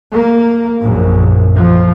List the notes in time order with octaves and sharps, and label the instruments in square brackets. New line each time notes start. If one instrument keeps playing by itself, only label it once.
[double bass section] A#3
A#1 F#2
F3